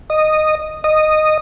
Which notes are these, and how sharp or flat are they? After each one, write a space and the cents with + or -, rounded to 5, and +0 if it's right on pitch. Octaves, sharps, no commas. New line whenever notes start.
D#5 -10
D#5 -10